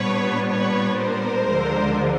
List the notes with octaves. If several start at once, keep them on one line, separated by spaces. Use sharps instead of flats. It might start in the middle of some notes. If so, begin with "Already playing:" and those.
Already playing: A#2 G3 B3 D4 B4 C#5
B4 C#5
A#4 C5
D2 D3 F3 G#3